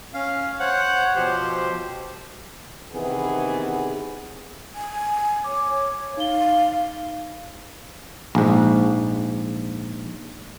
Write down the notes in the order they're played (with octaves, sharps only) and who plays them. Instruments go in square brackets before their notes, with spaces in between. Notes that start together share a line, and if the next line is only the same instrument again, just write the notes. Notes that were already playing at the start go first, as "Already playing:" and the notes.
[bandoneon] C#4 F5
[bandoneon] C5 C#5 [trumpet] F#5
[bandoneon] B2 F3 G4 [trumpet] C5
[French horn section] C3 D#3 E3 B3 G#4
[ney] G#5
[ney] C#5 [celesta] D6
[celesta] D#4 G7 [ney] F5
[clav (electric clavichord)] A#1 G#2